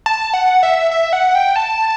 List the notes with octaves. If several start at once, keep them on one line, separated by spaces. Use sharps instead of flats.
A5
F#5
E5
E5
F#5
G5
A5